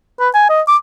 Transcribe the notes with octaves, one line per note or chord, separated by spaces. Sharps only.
B4
G#5
D#5
D6